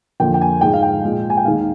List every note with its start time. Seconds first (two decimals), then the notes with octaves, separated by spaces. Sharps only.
0.20 F2 D3 F3 A#3 G5
0.34 G5
0.41 G#5
0.61 G#2 F3 G#3 G5
0.73 F5
0.82 G5
1.04 A#2 G#3
1.30 G#5
1.37 G5
1.45 D#2 D#3 G#3 F5